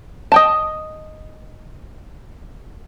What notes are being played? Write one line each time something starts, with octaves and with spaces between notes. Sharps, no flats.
D#5 G5 A5